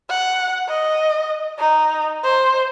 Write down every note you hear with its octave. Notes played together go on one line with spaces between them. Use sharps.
F#5
D#5
D#4
C5